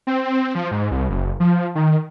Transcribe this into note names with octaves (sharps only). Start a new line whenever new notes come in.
C4
F3
G#2
C2
F#1
F3
D#3